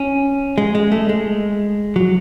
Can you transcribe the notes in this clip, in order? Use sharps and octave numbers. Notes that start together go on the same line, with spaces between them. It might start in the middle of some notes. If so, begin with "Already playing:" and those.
Already playing: C#4
G#3
G#3
A3
G#3
F#3